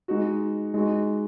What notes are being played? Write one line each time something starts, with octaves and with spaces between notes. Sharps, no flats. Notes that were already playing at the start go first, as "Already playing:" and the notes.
G#3 D#4 F#4
G#3 D#4 F#4